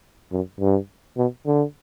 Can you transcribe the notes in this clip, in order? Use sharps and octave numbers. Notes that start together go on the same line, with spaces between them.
F#2
G2
B2
D3